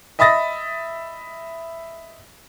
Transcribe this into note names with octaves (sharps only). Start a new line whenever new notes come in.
D#5 E5 B5 D#6 A6 A#6